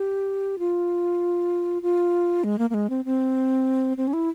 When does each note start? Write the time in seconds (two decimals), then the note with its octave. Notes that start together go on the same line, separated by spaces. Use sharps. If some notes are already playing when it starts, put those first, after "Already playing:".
Already playing: G4
0.59 F4
1.82 F4
2.44 G#3
2.59 A#3
2.70 A#3
2.74 G#3
2.90 C4
3.05 C4
3.97 C4
4.07 C#4
4.13 E4